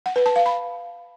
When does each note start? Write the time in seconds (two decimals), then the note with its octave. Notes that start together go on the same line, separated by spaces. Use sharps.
0.06 F#5
0.16 B4
0.26 A5
0.36 F5
0.46 B5